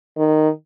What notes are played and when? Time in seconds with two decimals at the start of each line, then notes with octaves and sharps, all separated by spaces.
0.17 D#3